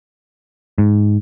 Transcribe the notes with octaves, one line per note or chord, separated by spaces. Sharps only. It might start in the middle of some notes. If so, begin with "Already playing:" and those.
G#2